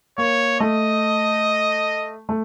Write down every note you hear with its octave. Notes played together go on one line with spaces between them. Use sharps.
A#3 C#5
A3 D#5
A3